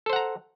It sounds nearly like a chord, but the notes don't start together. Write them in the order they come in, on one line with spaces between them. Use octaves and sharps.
A4 C5 F#5 A#5